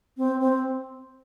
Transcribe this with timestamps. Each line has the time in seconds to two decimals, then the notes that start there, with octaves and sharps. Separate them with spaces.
0.17 C4
0.40 C4